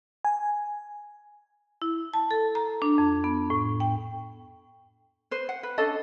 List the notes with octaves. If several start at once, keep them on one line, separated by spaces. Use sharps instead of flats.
G#5
E4
A5
A4
A#5
D4
F2
B3
A2
G5
B4 C5
F#5
B4
C#4 D4 A4 D#5